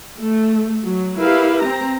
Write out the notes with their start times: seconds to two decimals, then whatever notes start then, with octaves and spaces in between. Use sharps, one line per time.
0.20 A3
0.84 F#3
1.18 E4 G4 A#4 B4 F5
1.61 C4 A#5